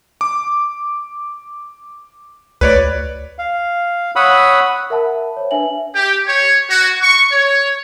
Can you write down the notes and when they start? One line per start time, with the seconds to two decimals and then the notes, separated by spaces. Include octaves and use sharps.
0.21 D6
2.61 D2 B4 C#5 D5
3.39 F5
4.16 C#5 F#5 B5 D#6 E6
4.90 A#4 E5 F#5 A5 B5
5.37 C5 C#5
5.51 D4 B4 E5 G#5 F#7
5.94 G4
6.26 C#5
6.69 F#4
7.02 C#6
7.32 C#5